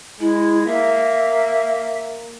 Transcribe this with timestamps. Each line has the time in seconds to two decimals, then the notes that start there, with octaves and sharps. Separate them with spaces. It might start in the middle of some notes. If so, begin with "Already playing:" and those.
0.20 G#3 E4
0.66 A#3 E5